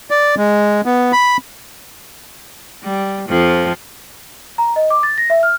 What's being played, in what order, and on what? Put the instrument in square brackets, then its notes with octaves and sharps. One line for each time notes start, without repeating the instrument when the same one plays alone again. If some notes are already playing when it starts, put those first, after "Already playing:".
[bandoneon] D5
G#3
B3
B5
[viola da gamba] G3
F2 F3
[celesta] A#5
D#5
D6
A6
A#6
E5
F6